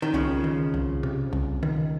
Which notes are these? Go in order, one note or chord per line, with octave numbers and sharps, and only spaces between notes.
D#3
C2 C#3 F3
D#3
C2
C3
C2
D#3